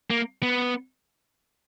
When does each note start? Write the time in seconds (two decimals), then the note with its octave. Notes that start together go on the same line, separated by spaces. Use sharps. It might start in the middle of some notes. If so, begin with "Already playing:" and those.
0.10 A#3
0.43 B3